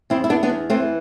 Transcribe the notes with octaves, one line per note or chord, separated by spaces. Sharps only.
E2 C4 E4
E4
E2 B3 D4
B3 D4
E2
E3 A3 C4